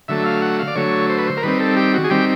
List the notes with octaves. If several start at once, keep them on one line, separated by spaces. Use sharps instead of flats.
D3 F#3 A3 E5
F5
F#5
F5
D5
D3 F#3 A3 C#5
C5
B4
C5
A#4
D#3 G3 C4 B4
A4
G4
F#4
G#4
D#3 G3 C4 G4